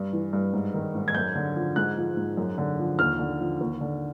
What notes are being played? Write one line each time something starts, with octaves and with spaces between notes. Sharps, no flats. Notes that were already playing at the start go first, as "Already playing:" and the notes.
Already playing: G2
E3
G2
G#2
D#3
G#2
G#6
F#2 G6
D3
F3
G#2 F#6
F3
G#2
F#2
D3
F3
D#2 F6
D3
F3
D#2
D3